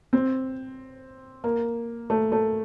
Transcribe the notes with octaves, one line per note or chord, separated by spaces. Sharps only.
C4
A#3
A3
A3